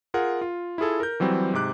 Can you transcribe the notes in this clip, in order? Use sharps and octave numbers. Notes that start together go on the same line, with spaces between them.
F4 G#4 A#4 F#5
F4
E4 F4 G#4 A4
A#4 G6
E3 F#3 G3 C4
G#2 C3 D6 F#6